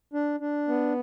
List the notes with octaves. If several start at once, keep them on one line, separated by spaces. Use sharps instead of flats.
D4
D4
B3